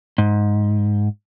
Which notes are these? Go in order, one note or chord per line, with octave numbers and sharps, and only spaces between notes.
G#2